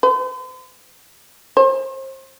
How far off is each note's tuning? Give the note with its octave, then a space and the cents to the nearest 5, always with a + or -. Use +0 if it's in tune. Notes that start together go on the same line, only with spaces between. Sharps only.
C5 -40
C5 +30